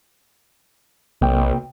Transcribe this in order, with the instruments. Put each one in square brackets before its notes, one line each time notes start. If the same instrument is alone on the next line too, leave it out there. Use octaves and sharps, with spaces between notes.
[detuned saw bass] B1 [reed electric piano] C3 A#3 G5